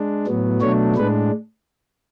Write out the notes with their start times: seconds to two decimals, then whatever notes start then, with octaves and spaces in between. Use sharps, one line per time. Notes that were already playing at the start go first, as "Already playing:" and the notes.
Already playing: G#3 D4
0.27 A2 F#3 B3
0.61 B2 F#3 A3 D4 C#5
0.95 A2 G#3 D4 B4